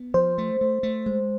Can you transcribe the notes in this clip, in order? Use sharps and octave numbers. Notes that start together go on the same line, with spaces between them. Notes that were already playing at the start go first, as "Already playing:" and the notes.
Already playing: B3
F3 C5
A3
A3
A3
G#3